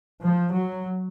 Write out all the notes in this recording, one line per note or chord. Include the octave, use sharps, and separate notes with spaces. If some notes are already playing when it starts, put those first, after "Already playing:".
F3
F#3